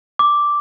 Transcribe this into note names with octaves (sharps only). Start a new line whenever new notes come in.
D6